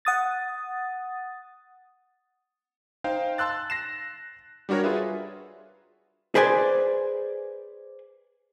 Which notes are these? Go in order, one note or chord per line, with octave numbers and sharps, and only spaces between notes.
F#5 D#6 A6
D#4 C5 F5 G5
A5 C6 E6 F#6 A6
A#6 C7 E7
G3 D4 F#4 A#4 C#5
F4 G#4 B4 E5 F#5
G#4 B4 C5 D5 G#5